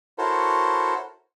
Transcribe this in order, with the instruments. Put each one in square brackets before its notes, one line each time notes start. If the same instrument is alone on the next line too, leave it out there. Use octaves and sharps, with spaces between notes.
[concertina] E4 F#4 A4 A#4 C5 C#5